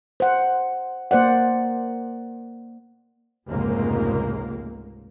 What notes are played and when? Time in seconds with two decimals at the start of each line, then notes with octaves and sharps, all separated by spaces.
0.20 C5 F#5
1.11 A#3 C5 D5 F#5
3.49 F1 C#2 G#2 A#3